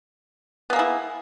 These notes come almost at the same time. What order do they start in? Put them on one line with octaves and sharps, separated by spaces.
B3 A#3 G#4 E4